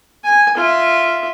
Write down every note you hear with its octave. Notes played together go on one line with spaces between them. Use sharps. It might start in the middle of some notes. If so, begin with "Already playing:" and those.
G#5
F4 E5